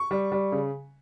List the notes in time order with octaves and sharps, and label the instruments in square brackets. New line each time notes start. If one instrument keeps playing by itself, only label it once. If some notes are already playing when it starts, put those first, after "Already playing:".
Already playing: [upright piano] C#6
G3
G3
C#3